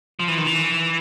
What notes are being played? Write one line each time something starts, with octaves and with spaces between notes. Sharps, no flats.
F3
E3
D#3
E3